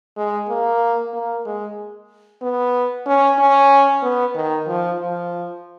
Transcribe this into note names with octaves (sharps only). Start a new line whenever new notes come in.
G#3
A#3
A#3
G#3
B3
C#4
C#4
B3
D#3
F3
F3